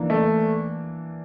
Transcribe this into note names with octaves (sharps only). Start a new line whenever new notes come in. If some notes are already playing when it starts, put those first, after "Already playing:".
Already playing: E3 A#3 D4
A3